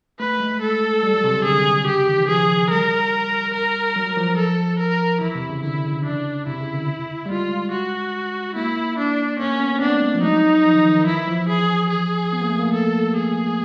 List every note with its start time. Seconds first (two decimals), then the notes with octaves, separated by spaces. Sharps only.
0.20 A3 B4
0.40 G#3
0.62 A4
1.03 G3
1.14 F#3
1.24 C3
1.34 C#3
1.45 D3 G#4
1.86 C#3 G4
2.08 D#3
2.18 E3
2.29 F3 G#4
2.71 G3 A#4
3.54 A#4
3.96 F#3
4.17 F3
4.37 A4
4.79 A#4
5.21 E3 E4
5.35 C3
5.50 C#3
5.63 D3 E4
5.84 C#3
6.05 D4
6.47 C3 E4
6.61 C#3
6.75 D3
7.26 G3
7.30 G#3 F4
7.72 F#4
8.56 A#3 E4
8.98 D4
9.40 A#3 C#4
9.60 B3
9.76 C4
9.82 B3 D4
9.95 A3
10.02 G#3
10.15 F3
10.23 F#3 D#4
10.65 F3
10.75 D#3
10.86 D#3
10.97 D#3
11.07 E3 E4
11.28 F3
11.49 G#4
11.90 G#4
12.33 B3
12.42 A#3
12.50 A3
12.59 A#3
12.74 A4
13.16 G#4